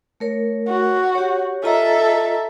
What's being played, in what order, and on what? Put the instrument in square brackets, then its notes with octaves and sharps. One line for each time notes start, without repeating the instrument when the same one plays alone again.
[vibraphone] A3 A#4 C#5
[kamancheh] F#4
[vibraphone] G4 C#5
[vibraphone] F4 D#5 A#5 [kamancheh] A4 E5